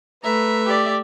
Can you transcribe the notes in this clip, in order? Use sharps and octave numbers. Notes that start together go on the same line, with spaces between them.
A3 B4 E5 A#5
G4 D5